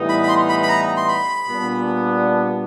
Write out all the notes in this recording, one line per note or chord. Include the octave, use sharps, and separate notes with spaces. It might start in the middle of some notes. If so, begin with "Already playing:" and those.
Already playing: A2 E3 G3 B3 D#4
B5
B5
C6
B5
B5
A#5
C6
B5
A#2 G3 B3 D4